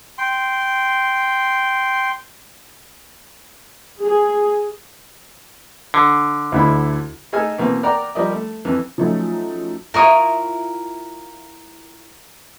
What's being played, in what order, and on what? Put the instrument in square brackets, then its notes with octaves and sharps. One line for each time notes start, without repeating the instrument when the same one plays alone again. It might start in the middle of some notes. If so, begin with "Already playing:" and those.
[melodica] G5 C6
[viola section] G#4
[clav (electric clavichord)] D3
[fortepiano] D2 E4 B5
A3 D#4 G#4 A4 G#5 F6
B2 E3 A#3 C4
A#4 D5 F#5 G5 A#5
F3 G3 A#4 D5 D#5
A3
F2 E3
[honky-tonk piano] F3 F#3 A3 C#4 D#4
[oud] E4 F4 C#5 [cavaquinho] A#4 C#6 D#6